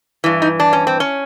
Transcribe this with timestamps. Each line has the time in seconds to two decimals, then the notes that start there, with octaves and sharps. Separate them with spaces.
0.24 G2 E3
0.42 D#4
0.60 D4
0.73 C#4
0.87 C4
1.00 C#4